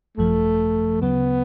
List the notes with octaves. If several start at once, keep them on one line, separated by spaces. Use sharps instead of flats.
G#1 F#2 F3 A3
D2 C#3 F#3 B3